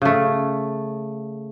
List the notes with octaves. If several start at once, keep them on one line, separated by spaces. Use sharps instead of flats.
C#3 A3